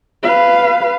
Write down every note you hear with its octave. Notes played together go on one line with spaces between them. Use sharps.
B4 F5